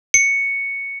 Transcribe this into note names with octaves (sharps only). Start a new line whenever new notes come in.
C#7